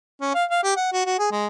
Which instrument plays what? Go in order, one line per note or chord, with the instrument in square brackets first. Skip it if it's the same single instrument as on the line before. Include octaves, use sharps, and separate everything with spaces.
[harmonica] C#4
F5
F5
G4
F#5
F#4
F#4
G#4
G#3